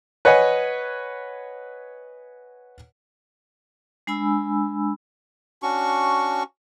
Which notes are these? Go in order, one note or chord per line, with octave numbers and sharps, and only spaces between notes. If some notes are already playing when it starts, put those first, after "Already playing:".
B4 C#5 D#5 F#5 G#5
G#3 D4 G#5 B5 E6
C#4 D4 F#4 C#6